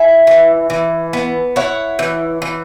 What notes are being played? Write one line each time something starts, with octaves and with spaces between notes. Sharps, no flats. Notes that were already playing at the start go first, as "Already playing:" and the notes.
Already playing: E4 E5 G#5
E3
E3
B3
E4 C#5 F#5
E3
E3